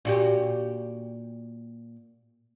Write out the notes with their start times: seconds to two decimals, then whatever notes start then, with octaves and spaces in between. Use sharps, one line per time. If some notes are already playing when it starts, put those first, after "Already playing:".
0.05 A#2 F#4 G4